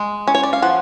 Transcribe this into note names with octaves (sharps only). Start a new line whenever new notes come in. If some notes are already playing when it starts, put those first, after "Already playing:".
Already playing: G#3
C#4
C#5
D5
F5
F3 F#5